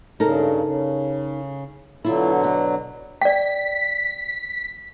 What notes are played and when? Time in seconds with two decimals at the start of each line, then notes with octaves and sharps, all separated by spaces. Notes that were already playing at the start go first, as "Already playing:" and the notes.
0.20 G2 C#3 D#4 A4 A#4
0.63 C#3
2.05 B2 D3 F#3 E4 F4
2.44 B4
3.21 D5 G5 B6